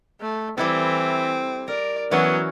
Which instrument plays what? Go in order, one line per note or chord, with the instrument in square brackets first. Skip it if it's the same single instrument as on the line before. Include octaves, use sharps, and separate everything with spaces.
[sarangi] A3
[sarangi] E3 [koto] G3 E4 A4 [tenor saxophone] C4
[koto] A#4 [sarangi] D5
[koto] E3 C#4 F#4 [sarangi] F#3 [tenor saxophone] B3